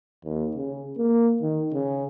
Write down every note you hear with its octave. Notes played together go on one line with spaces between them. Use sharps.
D#2
C#3
A#3
D#3
C#3